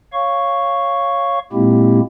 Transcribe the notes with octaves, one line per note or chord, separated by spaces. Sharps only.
C#5 F5 C#6
A#2 G#3 A#3 C4 E4 G4